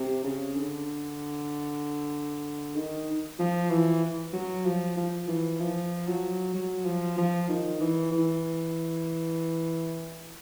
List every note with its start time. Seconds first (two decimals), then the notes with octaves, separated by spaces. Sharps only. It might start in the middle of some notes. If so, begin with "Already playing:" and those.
Already playing: C3
0.23 C#3
0.56 D3
2.76 D#3
3.39 F3
3.70 E3
4.33 F#3
4.65 F3
4.97 F3
5.28 E3
5.60 F3
6.08 F#3
6.54 F#3
6.85 F3
7.18 F3
7.49 D#3
7.81 E3
8.11 E3